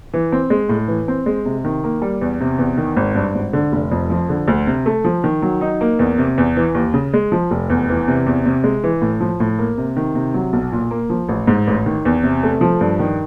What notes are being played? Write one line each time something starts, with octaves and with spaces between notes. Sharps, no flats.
E3
C4
G#3
A2
E3
C4
G#3
C3
D#3
A#3
G3
E2
C3
E2
D#3
G#1
G2
G#1
D3
F1
F2
F3
D3
D2
C3
A3
F3
D#3
F#3
D#4
A#3
E2
C3
E2
E3
D#2
C#3
G#3
F3
F1
E2
E3
C3
E2
C3
G#3
E3
A2
F3
A2
A#3
C3
D#3
C3
F#3
B1
A#2
A#3
F3
A1
G#2
A1
D#3
E2
C3
A3
F3
G2
D#3